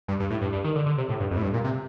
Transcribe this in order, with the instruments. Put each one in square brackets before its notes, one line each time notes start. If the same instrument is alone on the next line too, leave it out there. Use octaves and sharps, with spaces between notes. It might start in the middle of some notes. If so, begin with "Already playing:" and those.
[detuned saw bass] G2
G2
A2
G2
G2
D#3
D3
D3
C3
A2
G2
F2
A2
G2
A#2
C3